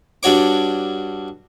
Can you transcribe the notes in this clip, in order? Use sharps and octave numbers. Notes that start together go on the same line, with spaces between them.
G2 D4 F#4 C#5 D6